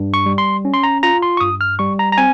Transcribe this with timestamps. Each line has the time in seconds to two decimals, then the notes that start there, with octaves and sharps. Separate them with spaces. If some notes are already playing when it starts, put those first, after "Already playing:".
Already playing: G2
0.14 C#6
0.26 G3
0.38 C6
0.65 C#4
0.74 C6
0.83 A#5
1.03 F4 A#5
1.22 C6
1.37 C#6
1.40 G2 D#6
1.61 F6
1.79 G3 C#6
1.99 A#5
2.12 A#5
2.18 C4 G#5